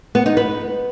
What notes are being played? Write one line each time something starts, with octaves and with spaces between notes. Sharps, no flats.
B3
D#4
B4